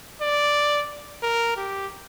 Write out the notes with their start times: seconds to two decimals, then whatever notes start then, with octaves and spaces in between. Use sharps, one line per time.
0.21 D5
1.22 A#4
1.57 G4